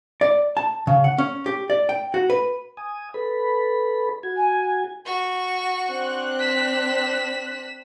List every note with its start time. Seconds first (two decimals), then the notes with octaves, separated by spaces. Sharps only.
0.21 D5
0.57 A5
0.87 C#3
1.04 F#5
1.18 C#4
1.46 G4
1.70 D5
1.89 G5
2.14 F#4
2.30 B4
2.77 G#5 D#6
3.14 A4 B4 B5
4.23 F#4 G#6
4.37 G#5
5.05 F#4 C#6
5.89 C4 D4 F#6
6.40 B6 E7